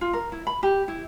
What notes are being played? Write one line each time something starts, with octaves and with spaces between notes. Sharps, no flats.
F4
A#4
E4
B5
G4
E4